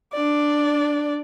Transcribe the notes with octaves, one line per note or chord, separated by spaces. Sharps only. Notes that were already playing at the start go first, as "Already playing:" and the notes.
D4 D5